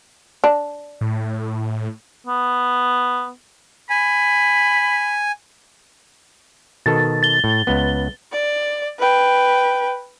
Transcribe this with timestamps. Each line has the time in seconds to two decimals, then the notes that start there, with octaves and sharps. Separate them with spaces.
0.44 D4
1.01 A2
2.27 B3
3.90 G#5 B5
6.86 B2 D#3 A4 A6
7.23 A6 G7
7.44 A2
7.67 C#2 B3
8.32 D5
8.99 B4 G5